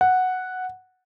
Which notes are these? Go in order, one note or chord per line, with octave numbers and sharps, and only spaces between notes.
F#5